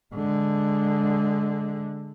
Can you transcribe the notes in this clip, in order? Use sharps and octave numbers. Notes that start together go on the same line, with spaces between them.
D3 G#3